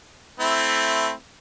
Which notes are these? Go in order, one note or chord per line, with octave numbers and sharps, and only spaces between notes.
A3 C4 E4